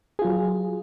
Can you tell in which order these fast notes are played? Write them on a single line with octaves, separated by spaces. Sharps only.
G#4 F4 F#3